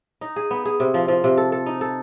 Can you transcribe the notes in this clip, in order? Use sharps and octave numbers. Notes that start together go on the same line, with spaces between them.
D#4
G#4
B3
G#4
C3
F3
F3
C3
A4
A4
D#4
A4